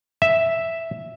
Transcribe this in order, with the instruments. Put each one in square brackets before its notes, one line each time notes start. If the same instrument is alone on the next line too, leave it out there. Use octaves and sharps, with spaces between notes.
[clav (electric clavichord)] E5